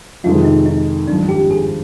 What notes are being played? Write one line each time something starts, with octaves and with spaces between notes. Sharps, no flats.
F2 C3 D#3 G#3 F4
D#4
D#4
G#1 G2 F3 D4
G4
G#4